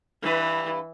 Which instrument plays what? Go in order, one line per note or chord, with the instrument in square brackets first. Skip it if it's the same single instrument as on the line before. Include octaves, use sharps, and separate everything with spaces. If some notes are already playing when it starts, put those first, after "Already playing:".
[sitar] G2 B4 [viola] E3